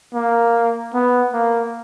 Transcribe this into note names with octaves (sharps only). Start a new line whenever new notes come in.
A#3
B3
A#3